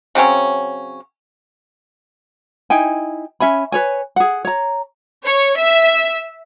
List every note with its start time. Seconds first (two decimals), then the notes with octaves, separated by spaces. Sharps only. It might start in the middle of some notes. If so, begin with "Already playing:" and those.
0.15 C#3 F#3 C4 C#4
2.70 D#4 E4 G5 G#5
3.40 C#4 E5 G#5 B5
3.72 B4 C#5 G#5
4.16 G#4 F#5
4.45 C#5 A#5
5.25 C#5
5.59 E5